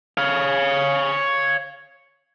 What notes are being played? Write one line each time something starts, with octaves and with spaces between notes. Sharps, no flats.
C#5 F5